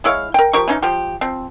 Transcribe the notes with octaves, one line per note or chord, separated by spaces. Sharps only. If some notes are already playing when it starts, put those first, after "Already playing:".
G#3 E4 C#5 F5
A#4 G5
F3 G4 A#4 C#6
E3 C#4 D#4
F3 F4 G4
F3 C4